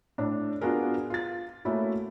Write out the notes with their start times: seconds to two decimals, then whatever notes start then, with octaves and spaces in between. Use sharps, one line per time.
0.18 A2 D4
0.61 B3 D4 F4 F#4 G#4 A#4
1.10 F4 A6
1.65 A3 A#3 C#4 E4 F#4